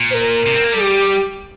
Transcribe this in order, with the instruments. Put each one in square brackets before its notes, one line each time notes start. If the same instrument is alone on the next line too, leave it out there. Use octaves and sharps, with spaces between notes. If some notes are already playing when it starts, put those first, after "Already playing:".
Already playing: [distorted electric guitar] A#2
[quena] C5
A#4
[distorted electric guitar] C3
C4
A#3
G3
[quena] G4